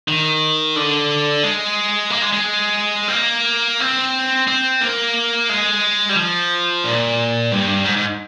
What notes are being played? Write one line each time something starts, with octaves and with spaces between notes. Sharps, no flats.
D#3
D3
G#3
A#3
G#3
G#3
C4
A#3
C4
C4
A#3
G#3
G3
F3
A#2
G2
G#2
G#2